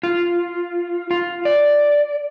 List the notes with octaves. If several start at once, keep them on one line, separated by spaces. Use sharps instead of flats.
F4
F4
D5